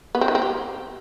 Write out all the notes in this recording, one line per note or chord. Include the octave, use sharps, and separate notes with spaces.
B3
C4
D#3
C4
G4